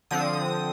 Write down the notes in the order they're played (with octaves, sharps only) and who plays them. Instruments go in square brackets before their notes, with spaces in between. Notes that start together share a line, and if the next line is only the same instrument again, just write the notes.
[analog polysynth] D3 F3 C4 D#6